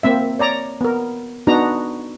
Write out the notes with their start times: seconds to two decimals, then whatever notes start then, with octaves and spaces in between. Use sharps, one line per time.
0.03 A#3 C4 E5
0.39 C#5 D5 A#5
0.81 B3 A#4
1.47 B3 D4 D#4 F#4 A#5